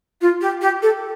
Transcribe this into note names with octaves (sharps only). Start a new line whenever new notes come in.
F4
G4
G4
A4